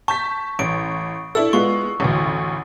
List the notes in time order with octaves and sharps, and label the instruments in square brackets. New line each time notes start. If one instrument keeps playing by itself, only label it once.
[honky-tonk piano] A5 G6 B6 [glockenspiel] C#6
[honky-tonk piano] A1 [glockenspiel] D7
[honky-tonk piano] D4 E4 A4 [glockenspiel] E6
[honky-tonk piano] G#3 B3 F4 [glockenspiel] C#6
[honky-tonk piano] A1 D2